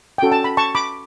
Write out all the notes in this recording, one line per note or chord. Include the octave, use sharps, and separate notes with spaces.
C#4 F#4 A4 G5
A5
B5
A5 C#6
B5 D6